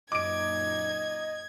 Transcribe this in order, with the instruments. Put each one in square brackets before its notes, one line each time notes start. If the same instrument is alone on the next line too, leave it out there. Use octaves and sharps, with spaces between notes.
[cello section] F#2 A#2 D#4 [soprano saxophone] D#5 [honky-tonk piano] D6 D7 [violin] G#6